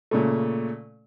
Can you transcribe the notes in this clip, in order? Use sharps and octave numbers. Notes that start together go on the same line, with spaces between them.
A#2 C#3 A3